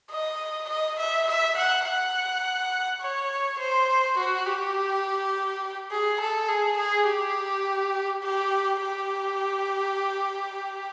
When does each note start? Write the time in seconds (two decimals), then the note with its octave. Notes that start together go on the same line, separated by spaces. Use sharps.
0.11 D#5
0.69 D#5
0.99 E5
1.28 E5
1.57 F#5
1.85 F#5
3.01 C#5
3.59 C5
4.18 F#4
4.46 G4
5.91 G#4
6.20 A4
6.48 G#4
6.77 G#4
7.07 G4
8.23 G4
8.81 G4